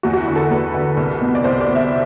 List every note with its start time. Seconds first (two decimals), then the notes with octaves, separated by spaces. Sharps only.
0.03 E2 F#4
0.13 F#4
0.20 E4
0.27 D3
0.36 A4
0.51 E2 B4
0.74 D3
0.97 C2
1.21 B2
1.35 D5
1.44 C2 C5
1.60 D5
1.68 B2
1.75 E5